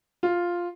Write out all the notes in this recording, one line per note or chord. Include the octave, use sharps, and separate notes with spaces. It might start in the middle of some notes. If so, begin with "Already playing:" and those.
F4